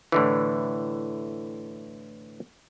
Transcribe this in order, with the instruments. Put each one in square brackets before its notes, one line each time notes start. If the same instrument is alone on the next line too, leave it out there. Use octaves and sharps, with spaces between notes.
[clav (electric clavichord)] A2 D3 E3